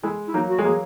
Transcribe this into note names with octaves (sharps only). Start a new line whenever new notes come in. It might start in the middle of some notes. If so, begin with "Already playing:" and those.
G#3 E4
E4
F#3 A#3 D#4
F#4
G#3
F#3 A#3 G#4